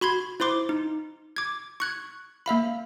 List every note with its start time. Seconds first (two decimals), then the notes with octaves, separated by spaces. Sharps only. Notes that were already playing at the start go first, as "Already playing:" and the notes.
0.01 F#4 B5 C6 G#6
0.40 E4 C5 C6 D6
0.69 D#4
1.36 D6 G#6
1.80 C#6 F#6 G#6
2.46 A#3 E5 F5 B5